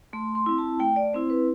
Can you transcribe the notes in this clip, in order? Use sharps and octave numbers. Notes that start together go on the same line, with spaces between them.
A3 C6
C6
C4 E4
A5
A3 G5
D5
C4 E4 C5
B4